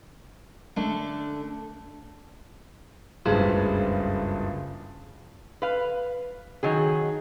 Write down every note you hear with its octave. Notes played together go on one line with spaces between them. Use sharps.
D3 A3 D4
F#1 C#2 G2 G#4 B4 C5
B4 F5
D#3 F#3 G#4